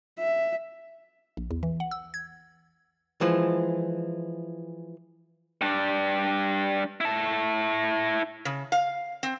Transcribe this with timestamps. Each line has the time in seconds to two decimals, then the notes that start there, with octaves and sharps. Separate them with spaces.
0.20 E5
1.37 A#1
1.51 E2
1.63 E3
1.80 F#5
1.91 E6
2.14 G#6
3.21 E3 F3 G#3
5.61 G3 D4
7.01 E4 A5
8.45 C#3
8.72 F5
9.23 C4